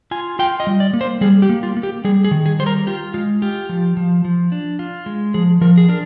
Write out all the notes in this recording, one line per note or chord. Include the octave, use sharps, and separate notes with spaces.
F4 G#5
F4 G5
D#5
G3
D5
A#3
C5
G3 G#4
G4
A#3
F4
A#3
G4
G3 G#4
G#4
D#3
G#4
G3 C5
A#4
F4 G4
G#3 F4
F4 G4
F3
F3
F3
D4
F4
G#3
F3 G#4
F3 A#4
G#4
D4 A#4